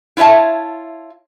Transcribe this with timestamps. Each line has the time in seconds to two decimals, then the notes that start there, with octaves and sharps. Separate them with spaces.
0.17 E4 F4 C#5 E5 A5